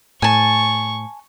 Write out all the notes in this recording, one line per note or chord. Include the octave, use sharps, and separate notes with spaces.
A2 G#5 A5 C#6